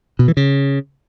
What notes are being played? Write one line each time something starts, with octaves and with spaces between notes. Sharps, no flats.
B2
E3
C#3